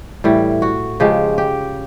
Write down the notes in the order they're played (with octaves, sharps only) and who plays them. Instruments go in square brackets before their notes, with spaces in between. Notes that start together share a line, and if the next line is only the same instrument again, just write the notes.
[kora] A2 E3 G3
F#4
C#3 F3 G#3 G4
G4